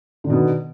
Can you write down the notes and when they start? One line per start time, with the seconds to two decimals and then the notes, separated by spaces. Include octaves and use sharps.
0.24 D3
0.27 D#3
0.30 B2
0.33 B3